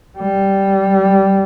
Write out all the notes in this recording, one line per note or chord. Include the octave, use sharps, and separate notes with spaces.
G3